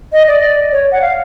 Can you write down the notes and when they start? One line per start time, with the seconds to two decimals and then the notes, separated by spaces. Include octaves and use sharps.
0.12 D#5
0.28 D5
0.72 C#5
0.92 F#5
1.01 F5